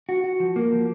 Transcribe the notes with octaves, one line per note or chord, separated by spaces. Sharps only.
F#4
F#4
F3
A#3
F3